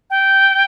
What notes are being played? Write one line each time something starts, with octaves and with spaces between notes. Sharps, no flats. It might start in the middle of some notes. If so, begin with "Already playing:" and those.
G5